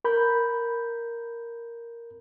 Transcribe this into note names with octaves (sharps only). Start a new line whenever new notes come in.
A#4 B5 G6